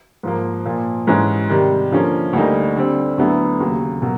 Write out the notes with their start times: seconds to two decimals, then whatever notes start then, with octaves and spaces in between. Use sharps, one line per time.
0.23 G#2 F3 A#3
0.65 A#2 F3 A#3
1.07 G#2 E3 G#3 C#4
1.49 C3 D#3 G3
1.91 D3 F3 A#3 C#4
2.33 D2 D3 G3 A#3 D#4
2.76 D3 G3 C4
3.18 D2 D3 F#3 B3 E4
3.60 D#2 C#3 F#3
4.02 B2 F#3 A#3